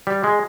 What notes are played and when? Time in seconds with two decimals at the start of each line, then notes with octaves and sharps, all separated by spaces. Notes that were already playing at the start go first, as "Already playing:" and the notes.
0.07 G3
0.24 G#3